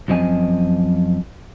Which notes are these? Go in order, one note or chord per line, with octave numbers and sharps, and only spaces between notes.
F#2 F3 C4 D#5 G#5